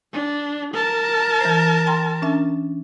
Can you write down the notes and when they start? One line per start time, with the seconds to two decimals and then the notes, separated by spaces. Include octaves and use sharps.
0.13 D4
0.74 A#4 A5
1.41 E3 C5
1.87 G5 A#5 C6
2.22 C#4 D4 E5